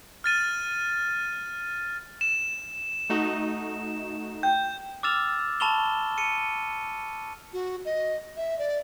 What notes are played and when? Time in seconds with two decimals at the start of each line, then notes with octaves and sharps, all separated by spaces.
0.24 F6 A6 D#7
2.21 E7
3.10 A3 D#4 F#4
4.43 G5 G6
5.03 D6 E6 F6 A6 E7 F7
5.60 A5 B5 C#6 E7 F7 G7
6.18 C#7 D#7
7.53 F#4
7.85 D#5
8.37 E5
8.59 D5